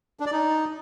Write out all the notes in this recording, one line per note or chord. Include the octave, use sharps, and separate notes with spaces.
D4
D5
D#4